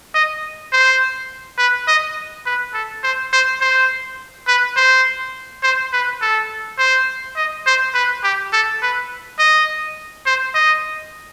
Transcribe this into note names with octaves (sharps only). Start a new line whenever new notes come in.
D#5
C5
B4
D#5
B4
A4
C5
C5
C5
B4
C5
C5
B4
A4
C5
D#5
C5
B4
G4
A4
B4
D#5
C5
D#5